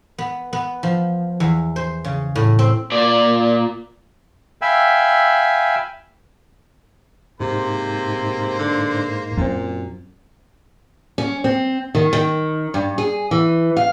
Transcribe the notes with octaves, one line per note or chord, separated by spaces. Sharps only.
B3
B3
F3
E2
C5
C#3
A2
C4
A#2 D5
E5 F5 G5 G#5 B5 E6
G#2 C3 A#3 C5
D3
F#2 A#2 C4
C#4
C4
D#3
D#3
G2
G#4
E3
F5